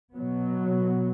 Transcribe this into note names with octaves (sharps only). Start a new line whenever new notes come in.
B2 F#3 B3